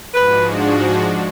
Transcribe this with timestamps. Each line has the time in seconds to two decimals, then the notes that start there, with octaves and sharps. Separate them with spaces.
0.14 G#2 F3 G#3 D4 F#4 B4